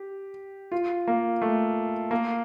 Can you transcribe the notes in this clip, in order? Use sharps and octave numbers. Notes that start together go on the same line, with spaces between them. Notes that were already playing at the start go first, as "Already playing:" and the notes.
Already playing: G4
F4
A#3
A3
A#3